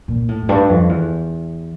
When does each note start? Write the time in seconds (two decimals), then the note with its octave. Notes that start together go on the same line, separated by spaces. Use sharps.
0.08 A#2
0.29 A2
0.42 F2
0.49 G2
0.69 F2
0.89 E2